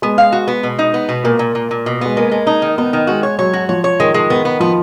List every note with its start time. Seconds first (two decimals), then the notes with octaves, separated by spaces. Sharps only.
0.02 G#3 B3
0.18 F5
0.32 F#4
0.48 B3
0.63 B2
0.79 D#4
0.94 B3
1.09 B2
1.24 A#2 A#3
1.39 A#2
1.55 A#2
1.71 A#2
1.86 B2
2.01 G#3 B3
2.17 G#3 A#3
2.31 G#3
2.47 D#4
2.62 D#3
2.78 B3 D#4
2.93 D#3
3.07 G#3 F#4
3.23 C#5
3.39 F#3 C#5
3.53 F#4
3.69 F3 C#5
3.84 C#5
4.00 D#3 G#3
4.14 G#3
4.30 D#3 B3
4.45 B3
4.60 F3 B3